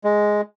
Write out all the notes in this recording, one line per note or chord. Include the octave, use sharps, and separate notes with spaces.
G#3